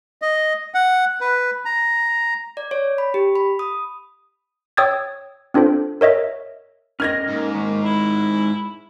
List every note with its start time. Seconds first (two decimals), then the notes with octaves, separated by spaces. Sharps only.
0.22 D#5
0.74 F#5
1.21 B4
1.65 A#5
2.57 D5
2.71 C#5
2.98 B5
3.14 G4
3.35 B5
3.59 D#6
4.77 C#5 G5 D#6 E6 G#6 A6
5.54 C4 D4 F4 A4 C5
6.01 A#4 C#5 D#5 E5
7.00 C#4 A#4 D#5 F6 G#6 A#6
7.28 G#2 A#3
7.55 D#3 G#3
7.84 E4